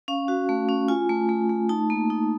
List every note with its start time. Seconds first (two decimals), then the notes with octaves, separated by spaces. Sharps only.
0.08 C#4 F5
0.28 F#4
0.49 A3
0.69 C#4
0.88 F4 G#5
1.09 A3
1.29 A3
1.49 A3
1.69 D#4 A5
1.90 A#3
2.10 D#4